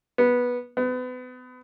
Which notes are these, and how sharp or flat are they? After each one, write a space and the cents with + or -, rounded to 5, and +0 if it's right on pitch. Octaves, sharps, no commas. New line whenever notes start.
B3 -10
B3 +35